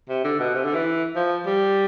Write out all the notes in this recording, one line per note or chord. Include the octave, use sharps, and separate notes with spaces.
C3
D3
B2
C3
D3
E3
F3
G3